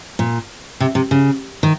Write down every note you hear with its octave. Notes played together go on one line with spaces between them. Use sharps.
A#2
C3
C3
C#3
D#3